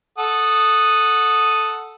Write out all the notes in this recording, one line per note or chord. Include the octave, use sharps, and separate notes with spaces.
A4 F#5 D#6